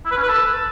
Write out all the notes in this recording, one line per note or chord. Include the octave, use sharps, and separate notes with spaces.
E4
B4
C#4
B4
A4